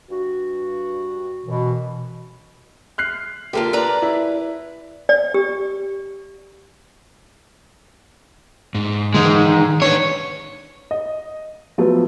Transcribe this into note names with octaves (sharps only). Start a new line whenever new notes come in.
G2 F#4
F#2 B2 E3
F6 F#6 C7
D3 A#3 F4 G4 A4 A#4
B4 D5 A#5
E4
D5
G4
G#2
D#3 E3 G#3 D#4
D4 D#4 B4 C#5
D#5
F3 F#3 A3 B3